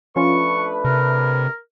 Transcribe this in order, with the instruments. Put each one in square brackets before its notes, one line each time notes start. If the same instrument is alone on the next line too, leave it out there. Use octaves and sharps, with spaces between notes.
[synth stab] F3 C#4 F4 [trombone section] A3 D4 B4 [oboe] C#6
[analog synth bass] C3 [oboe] A#4